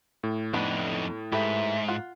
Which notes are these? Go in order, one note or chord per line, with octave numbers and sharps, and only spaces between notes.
A2
F2 B3 D4 D#4
G#2 G4 A4 B4 E5
F4 F#5